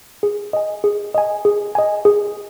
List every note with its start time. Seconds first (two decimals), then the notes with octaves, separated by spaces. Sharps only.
0.23 G#4
0.53 D#5 G#5
0.84 G#4
1.14 D#5 G#5
1.45 G#4
1.75 D#5 G#5
2.05 G#4